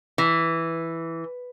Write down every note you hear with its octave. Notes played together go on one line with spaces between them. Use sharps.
E3